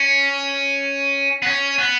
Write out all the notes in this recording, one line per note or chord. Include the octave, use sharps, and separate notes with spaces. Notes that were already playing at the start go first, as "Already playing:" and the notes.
Already playing: C#4
B3
C#4
B3